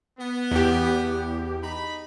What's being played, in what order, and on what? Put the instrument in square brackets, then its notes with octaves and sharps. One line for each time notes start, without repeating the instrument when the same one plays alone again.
[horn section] B3
[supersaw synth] E2 G4
[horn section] D#4 B5